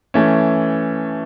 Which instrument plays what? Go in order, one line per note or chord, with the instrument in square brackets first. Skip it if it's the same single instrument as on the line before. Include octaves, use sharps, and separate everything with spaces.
[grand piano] E3 A3 C#4